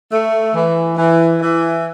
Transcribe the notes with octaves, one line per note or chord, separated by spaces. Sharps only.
A3
E3
E3
E3